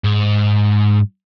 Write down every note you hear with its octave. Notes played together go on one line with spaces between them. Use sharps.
G#2